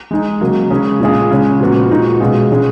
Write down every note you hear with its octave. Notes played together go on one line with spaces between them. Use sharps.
G#3 D#4 G#4
C#3 F#3 A#3
C#3 G#3 C#4 G#4
A#2 G#3 C#4 F4 G#4
C#3 G#3 C#4
A#2 F3 B3 F#4
A#2 G#3 D#4 F#4
B2 G#3 C#4 F4 G#4
G#3 C#4 G#4